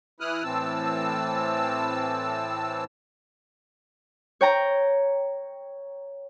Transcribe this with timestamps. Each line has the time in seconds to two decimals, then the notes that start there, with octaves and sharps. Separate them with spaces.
0.20 E3 E4 D#6 F6 F#6
0.44 A2 E3 C4 A5 E6
4.41 C#5 G5 A#5